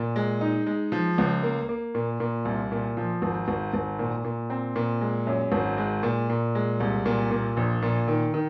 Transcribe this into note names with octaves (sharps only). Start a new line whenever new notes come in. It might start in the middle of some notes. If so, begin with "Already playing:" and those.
Already playing: A#2
G#3
D#4
G#3
F3
C#2
A#3
A#3
A#2
A#2
C2
A#2
F3
G#1
G#1
G#1
A#2
A#2
C4
A#2
G#3
F#2
G#1
G#3
A#2
A#2
G#3
C2
A#2
A#2
A#1
A#2
D#3
D#3